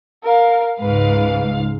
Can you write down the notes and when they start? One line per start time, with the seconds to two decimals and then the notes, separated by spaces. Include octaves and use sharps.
0.23 A#4 F5
0.79 C#2 G#2 B4 F5